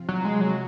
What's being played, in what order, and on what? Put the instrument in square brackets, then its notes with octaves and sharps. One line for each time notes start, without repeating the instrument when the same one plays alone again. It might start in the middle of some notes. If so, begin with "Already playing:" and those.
Already playing: [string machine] C3 F3 C4 F4
[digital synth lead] F#3
G#3
F#3